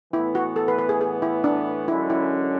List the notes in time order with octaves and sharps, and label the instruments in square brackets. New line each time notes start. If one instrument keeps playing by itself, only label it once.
[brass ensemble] A2 E3 B3 [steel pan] E4
[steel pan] F#4
A4
B4
B4
G#4
G#4
E4
D4
[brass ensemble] F#2 D3 G#3 C#4 [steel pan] E4
[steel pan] E4